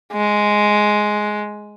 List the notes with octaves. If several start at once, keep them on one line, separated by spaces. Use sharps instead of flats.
G#3